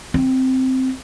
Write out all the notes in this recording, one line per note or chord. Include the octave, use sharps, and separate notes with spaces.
C4